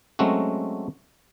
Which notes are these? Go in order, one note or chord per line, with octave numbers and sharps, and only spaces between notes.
F#3 G#3 A3 C4 C#4 F#4